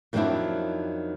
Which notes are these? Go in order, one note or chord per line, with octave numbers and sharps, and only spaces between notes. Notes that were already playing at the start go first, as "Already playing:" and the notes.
F2 D#3 F#3 C4 D4 E4